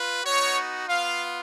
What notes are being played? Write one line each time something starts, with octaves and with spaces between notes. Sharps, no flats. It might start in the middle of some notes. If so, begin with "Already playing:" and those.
Already playing: F4 B4
B3 D#4 F#4 C#5
B3 F4 F5